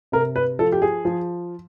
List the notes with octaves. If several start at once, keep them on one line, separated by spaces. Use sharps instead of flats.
C3 A#4
B4
F3 A4
G4
G#4
F3